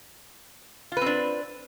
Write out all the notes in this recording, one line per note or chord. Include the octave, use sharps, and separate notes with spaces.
C4 D4 F4 B4